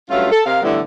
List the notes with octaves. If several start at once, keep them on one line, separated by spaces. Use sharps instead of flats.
G2 F#3 A3 C#4 F4
A4
C3 A#4 D#5 F5
A2 D3 E3 G3 B3 E4